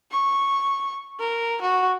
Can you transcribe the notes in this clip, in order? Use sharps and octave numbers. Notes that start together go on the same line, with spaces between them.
C#6
A#4
F#4